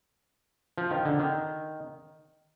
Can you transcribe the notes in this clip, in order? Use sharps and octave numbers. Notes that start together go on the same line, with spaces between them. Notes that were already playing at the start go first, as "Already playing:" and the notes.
F3
D#3
D3
D#3